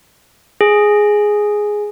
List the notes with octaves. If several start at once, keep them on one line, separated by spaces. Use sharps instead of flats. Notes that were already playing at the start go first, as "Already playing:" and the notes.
G#4